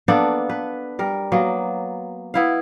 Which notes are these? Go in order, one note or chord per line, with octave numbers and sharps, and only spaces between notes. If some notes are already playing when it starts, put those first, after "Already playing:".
A#3 B3 D4 A4
B4
G3 A#4
F#3 A#3 B3
B3 E4 F5